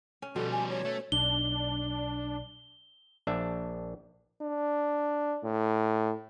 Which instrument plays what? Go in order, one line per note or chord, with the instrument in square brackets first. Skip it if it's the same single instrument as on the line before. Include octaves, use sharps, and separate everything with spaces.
[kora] C#4
[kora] B2 [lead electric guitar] F3 G3 [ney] A4
[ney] G#5
C#5
[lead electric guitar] A3
[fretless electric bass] B1 [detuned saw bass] D4 [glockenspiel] G7
[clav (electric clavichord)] A#1 D4 E5
[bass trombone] D4
A2